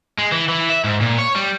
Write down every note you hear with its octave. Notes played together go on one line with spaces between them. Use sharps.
G#3
E3
E3
E5
G#2
A#2
C#5
G3